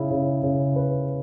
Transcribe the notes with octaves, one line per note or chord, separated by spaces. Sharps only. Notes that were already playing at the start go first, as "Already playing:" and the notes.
Already playing: C#3 E4
C#3
C#3
B4